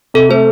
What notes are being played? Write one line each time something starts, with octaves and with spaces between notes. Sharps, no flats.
C3 A4
A3 C5